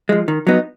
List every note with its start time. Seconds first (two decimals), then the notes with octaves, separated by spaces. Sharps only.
0.09 F3 G#3
0.28 D#3
0.47 F#3 B3 D#4